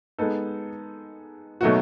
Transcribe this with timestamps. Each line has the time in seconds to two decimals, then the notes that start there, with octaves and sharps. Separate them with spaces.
0.18 G#3 B3 D#4 A4
1.61 B2 F#3 A3 D#4 F#4